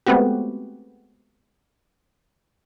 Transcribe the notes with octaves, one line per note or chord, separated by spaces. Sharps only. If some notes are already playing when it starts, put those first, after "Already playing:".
G#3 A3 B3 C4 F#4 G4